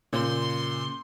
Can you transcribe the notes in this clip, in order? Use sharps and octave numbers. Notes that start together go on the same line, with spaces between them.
A#2 C#3 C6 G6